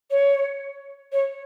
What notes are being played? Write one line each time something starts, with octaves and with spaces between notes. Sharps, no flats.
C#5
C#5